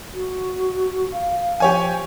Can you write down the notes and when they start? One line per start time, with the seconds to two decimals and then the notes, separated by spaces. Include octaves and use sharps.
0.14 F#4
1.12 F5
1.60 F3 G4 C#5 G#5